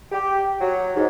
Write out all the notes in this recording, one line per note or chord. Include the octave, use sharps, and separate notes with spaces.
G4
F#3
G#2